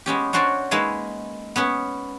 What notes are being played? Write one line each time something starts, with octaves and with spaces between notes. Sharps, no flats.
G#3 B3 C#4 G4
C#4 D4 F#4 C5 D5
G#3 A#3 D#4 B4 C#5 E5
B3 C#4 B4